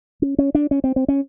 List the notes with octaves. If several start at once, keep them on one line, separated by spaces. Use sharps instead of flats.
C#4
C#4
D4
C#4
C4
C4
C#4